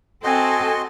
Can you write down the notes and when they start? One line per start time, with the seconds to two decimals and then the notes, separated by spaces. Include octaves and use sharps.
0.24 C4 F#4 A4 D#5 G#5 C6